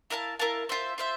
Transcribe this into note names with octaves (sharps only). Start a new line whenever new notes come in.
E4 A#4 F5 A5
E4 A#4 F5 A5
F4 C5 E5
F4 C5 E5